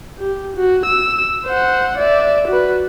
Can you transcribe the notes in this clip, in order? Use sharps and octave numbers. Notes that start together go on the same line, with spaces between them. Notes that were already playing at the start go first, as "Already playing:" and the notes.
G4
F#4
E6
C5 F#5
D5 E5
F#4 B4